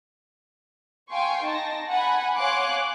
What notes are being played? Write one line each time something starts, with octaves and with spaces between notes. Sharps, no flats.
F5 G5 G#5 C6 C#6
D#4 A5 A#6
F#5 G#5 B5
C#5 F5 G#5 C6 D6 F#6